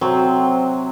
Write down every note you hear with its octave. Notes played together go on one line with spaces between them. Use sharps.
C3 F#3 C4